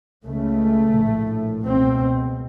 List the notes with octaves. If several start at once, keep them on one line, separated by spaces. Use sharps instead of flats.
C#2 C#3 A3
A#1 A2
C#2 B2 C4